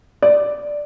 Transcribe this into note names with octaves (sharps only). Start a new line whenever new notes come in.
D5